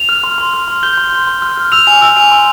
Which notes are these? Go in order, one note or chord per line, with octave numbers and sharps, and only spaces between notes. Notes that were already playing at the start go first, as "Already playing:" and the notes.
Already playing: F7
F6
C6
C6
F6
C6
G6 G7
C6
C6
C6
F6
F6
E6 F7
G#5 F7
E6 F7
G#5 F7
C6